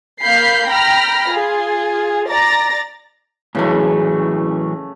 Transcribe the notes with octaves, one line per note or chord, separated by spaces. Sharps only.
A#3 F5 B5 G6 C7
G5 A#5 B5 F6 A#6
F4 G#4
D5 A#5 A6 A#6
A2 C#3 E3 F#3 A3